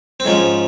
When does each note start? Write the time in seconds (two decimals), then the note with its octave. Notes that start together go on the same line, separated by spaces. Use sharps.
0.20 C4
0.25 G#2 F3 G#3 C#4